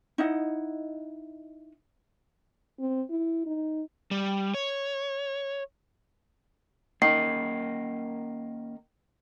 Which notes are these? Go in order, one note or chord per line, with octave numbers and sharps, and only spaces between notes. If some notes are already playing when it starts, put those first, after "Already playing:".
D#4 E4 D#5 F#5
C4
E4
D#4
G3
C#5
D#3 A#3 C#4 A#4 C7